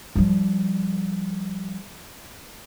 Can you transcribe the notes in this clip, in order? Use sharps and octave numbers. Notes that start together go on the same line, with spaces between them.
F3 G3